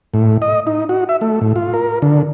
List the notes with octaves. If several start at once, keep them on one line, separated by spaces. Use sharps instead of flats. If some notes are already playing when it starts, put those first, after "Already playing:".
A2
D#5
D#4
F#4
E5
A3
A2
F4
A#4
D3